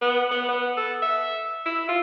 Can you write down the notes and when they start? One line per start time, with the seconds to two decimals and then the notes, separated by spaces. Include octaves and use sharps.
0.02 B3
0.31 B3
0.49 B3
0.77 A4
1.02 E5
1.66 E4
1.89 F4